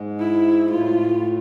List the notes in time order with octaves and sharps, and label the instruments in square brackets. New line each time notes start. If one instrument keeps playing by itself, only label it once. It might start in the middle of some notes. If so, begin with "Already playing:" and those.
Already playing: [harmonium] G#2 G#3
[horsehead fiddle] E4
[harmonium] A2 A3 [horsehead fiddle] F4